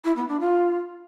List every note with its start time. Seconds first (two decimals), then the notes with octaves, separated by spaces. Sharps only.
0.04 E4
0.16 B3
0.28 D4
0.40 F4